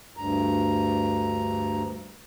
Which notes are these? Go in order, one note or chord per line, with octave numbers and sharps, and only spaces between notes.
D2 G2 A#5